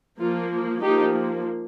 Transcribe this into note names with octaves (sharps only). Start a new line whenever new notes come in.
F3 A#3 F4
F3 A#3 D#4 G4